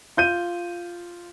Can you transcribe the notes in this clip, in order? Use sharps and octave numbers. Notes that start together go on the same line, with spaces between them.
F4 G6 D#7